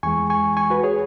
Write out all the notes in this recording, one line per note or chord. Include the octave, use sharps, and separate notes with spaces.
E2 E3 G#3 G#5 C#6
G#5 C#6
G#5 C#6
F#4 B4
G#4 C#5